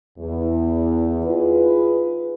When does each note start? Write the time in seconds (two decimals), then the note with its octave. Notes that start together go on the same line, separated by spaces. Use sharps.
0.19 E2
1.26 D#4 F4 G#4 B4